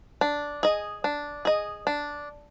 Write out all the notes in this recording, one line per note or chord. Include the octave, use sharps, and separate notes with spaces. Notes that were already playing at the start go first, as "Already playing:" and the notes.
D4
G#4 D#5
D4
G#4 D#5
D4